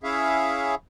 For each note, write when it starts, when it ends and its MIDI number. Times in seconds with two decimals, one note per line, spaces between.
0.04 0.75 61
0.04 0.75 64
0.04 0.75 68
0.04 0.75 73
0.04 0.75 76
0.04 0.75 77